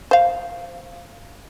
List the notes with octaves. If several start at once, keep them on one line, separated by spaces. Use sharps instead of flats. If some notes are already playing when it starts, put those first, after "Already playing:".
C5 F5